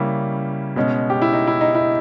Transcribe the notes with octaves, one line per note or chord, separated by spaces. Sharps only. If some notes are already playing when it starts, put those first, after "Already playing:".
Already playing: C#3 G3 A#3 C#4 E4
B2 G#3 C#4
G4
E4
D#4
E4
D#4
D#4
E4